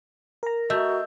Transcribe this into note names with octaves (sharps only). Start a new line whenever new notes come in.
A#4 A#5
A3 F#4 D#5 E6 G6